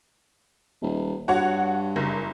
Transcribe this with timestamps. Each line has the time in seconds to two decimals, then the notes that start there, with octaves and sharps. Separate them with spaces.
0.82 D#1
1.28 G2 F#4 C#5 F#5
1.96 F#1